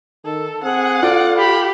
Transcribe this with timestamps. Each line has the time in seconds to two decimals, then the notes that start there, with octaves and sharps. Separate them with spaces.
0.25 D#3 A4
0.63 C4 G#4 F#5
1.03 F4 A4 D5
1.38 G4 B5